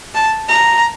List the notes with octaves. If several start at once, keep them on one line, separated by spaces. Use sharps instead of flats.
A5
A#5